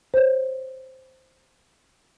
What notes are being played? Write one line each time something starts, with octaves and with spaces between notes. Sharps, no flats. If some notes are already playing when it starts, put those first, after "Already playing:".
C5 C#5